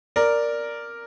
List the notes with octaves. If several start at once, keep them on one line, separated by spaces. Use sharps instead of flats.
A#4 D5